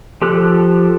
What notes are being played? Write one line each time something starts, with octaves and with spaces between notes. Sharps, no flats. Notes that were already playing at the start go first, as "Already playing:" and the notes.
F3 G4 A4 F#6